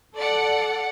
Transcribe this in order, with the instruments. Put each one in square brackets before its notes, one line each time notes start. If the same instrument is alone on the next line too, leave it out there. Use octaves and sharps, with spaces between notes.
[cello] A4 [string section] D5 F#5